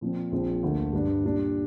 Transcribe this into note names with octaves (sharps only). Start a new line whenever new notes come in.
A#2 F3 C4
A#1 A#2 F3 C4
D2 D3 A#3
G2 G3 D4
A#2 G3 D4